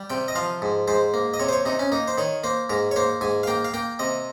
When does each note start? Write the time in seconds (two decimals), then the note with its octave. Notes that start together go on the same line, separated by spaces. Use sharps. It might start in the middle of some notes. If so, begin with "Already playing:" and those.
Already playing: G3
0.10 C3 G5
0.28 D#5
0.35 F3 F5
0.62 G#2
0.88 G#2 C5
1.14 A#3
1.34 D#5
1.40 C3 C#5
1.49 C5
1.53 C#5
1.65 C3 D#4
1.79 C#4
1.92 A#3 D#4
2.08 C5
2.18 D#3 C#5
2.44 A#3 C5
2.69 G#2 A#4
2.91 C#5
2.96 A#3 C5
3.21 G#2 G#5
3.43 F5
3.47 A#3 G5
3.65 F5
3.74 A#3 G5
3.99 C3 D#5